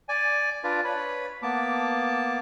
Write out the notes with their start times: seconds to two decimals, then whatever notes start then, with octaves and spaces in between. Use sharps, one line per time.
0.09 D5 G#5
0.64 D4 F4 B4 D5
0.84 B4 C#5 B5
1.43 A#3 B3 A5 D6